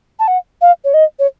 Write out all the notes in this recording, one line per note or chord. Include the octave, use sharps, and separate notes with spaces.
A5
F#5
F5
C#5
D#5
C#5